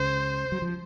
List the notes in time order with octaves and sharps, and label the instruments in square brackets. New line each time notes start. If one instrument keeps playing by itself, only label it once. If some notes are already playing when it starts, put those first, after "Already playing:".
Already playing: [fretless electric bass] C#2 C#3 [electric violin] C5
[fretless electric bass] F#3
F3